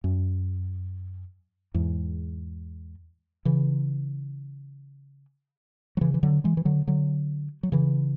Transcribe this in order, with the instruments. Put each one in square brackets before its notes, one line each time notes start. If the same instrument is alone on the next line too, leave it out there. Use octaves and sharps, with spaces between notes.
[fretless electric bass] F#2
E2 G#2
C#3 E3
F#3
C#3 E3
E3
D3 F#3
E3 G#3
E3
D3 F#3
D3 F#3
F#3
C#3 E3